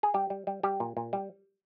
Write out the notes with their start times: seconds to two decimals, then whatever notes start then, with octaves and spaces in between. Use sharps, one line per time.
0.03 G#4
0.14 G3 G4
0.30 G3
0.47 G3
0.63 G3 G4
0.80 A#2
0.97 A#2
1.13 G3